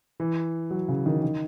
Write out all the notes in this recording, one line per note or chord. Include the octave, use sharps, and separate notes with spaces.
E3
F#3
C#3
D#3
D#3